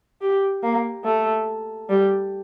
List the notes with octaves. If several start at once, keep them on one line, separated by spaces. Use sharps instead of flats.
G4
A#3
A3
G3